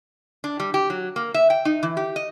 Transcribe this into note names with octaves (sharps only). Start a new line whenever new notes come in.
D4
G3
G4
F#3
A#3
E5
G5
D#4
E3
G4
D#5